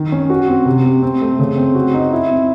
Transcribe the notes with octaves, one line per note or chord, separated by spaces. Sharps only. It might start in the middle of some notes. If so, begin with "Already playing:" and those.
Already playing: D#3
C#4
F#4
C4
C3
C4
C4
A3
C#3
C4
F#4
D#4
E4
C4